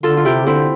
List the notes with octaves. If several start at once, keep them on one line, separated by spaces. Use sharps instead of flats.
D3 F4 A4
F4
C3 E4 G4
D3 C4 E4